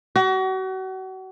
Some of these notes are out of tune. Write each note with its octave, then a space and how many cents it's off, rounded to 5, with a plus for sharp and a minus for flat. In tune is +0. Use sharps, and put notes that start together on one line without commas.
F#4 +35